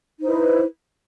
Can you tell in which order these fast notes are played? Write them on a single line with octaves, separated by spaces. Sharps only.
D#4 C5 E4 B4